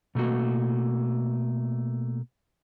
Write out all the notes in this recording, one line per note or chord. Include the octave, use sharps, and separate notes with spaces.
B2 A3 A#3 F#4